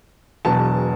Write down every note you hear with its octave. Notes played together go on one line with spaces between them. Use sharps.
E1 E2 B2 F#3 A5